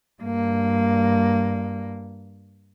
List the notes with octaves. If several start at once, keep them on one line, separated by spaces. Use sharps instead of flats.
G2 A#3